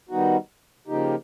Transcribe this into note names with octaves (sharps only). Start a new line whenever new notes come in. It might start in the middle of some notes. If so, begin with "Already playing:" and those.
D#3 G3 B3 D#4 F#4
C#3 F3 A#3 D#4 G4